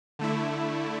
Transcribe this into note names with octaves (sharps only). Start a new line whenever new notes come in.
D3 A3 E4